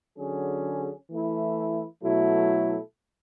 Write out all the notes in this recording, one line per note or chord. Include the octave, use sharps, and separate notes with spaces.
D3 F#3 C#4 G#4
E3 A3 E4
B2 F#3 A3 E4 A4